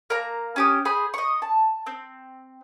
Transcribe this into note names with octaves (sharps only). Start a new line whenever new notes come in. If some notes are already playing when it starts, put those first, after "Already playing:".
A#3 A#5
C#4 G4 D#6
G#4 C5 B5
D#5 C#6
A5
C4